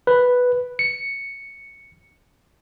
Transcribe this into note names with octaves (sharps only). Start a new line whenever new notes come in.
B4
C#7